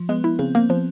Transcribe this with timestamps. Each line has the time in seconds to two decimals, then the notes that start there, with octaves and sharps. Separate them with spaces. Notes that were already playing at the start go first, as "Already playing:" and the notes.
Already playing: F3
0.09 G#3 B3
0.24 E4
0.39 C#3 C4
0.55 A#3 C4
0.69 F3 B3